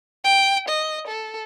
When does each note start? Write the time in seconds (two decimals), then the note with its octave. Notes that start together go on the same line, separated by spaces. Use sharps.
0.24 G5
0.68 D#5
1.07 A4